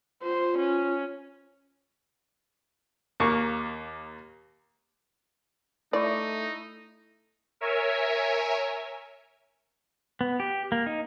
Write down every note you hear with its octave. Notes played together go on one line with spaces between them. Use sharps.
F4 C5
C#4
D#2 A#3 C#6
A3 D#4 E4 D5 C#6
A#4 C#5 E5 G#5
B3
G4
A#3
D#4